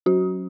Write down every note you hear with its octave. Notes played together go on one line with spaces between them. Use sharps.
F#3 C#4 F#4